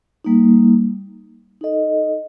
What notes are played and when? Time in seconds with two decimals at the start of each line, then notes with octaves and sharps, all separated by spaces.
0.24 G3 A#3 D#4
1.61 D#4 A4 D#5